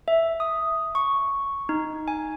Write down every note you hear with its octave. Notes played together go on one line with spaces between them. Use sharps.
E5
D#6
C#6
D#4
G#5